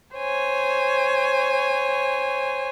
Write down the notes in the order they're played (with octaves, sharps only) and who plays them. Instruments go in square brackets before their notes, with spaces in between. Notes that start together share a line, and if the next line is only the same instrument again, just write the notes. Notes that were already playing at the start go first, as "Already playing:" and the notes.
[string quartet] C5 C#5 G#5